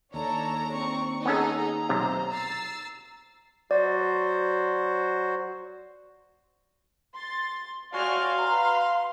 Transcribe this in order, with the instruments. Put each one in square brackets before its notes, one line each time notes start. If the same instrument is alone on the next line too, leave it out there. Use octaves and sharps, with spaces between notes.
[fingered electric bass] D#2 [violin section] D4 A#5 [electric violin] A4 C#5
[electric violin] C4 C#6
[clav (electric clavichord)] B3 C#4 A4 [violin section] D#4 G#4 [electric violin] A#5
[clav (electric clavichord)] B1 C3 [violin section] C5
[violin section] E6 A6 C7
[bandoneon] F#3 F#4 C5 [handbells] D5
[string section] C6 A6
[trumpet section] A3 C#5 G#5 [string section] F#4 D5 F6 [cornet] F5 [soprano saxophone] C6
[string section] B4 [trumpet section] A#5